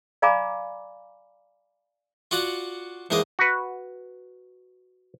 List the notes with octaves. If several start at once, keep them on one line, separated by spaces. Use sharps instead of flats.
D5 F5 G#5 A#5 B5 D6
F4 F#4 D5 F#5
E2 G#2 A#3 D#5 D6
F#4 B4